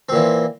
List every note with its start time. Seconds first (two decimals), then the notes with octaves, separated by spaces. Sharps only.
0.09 C4
0.12 A#2
0.15 E3